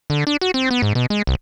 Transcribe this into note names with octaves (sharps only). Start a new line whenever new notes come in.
D3
D4
F#4
C4
B3
G#2
B2
G#3
C2